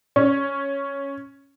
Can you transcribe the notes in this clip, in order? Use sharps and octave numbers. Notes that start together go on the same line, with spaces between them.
C#4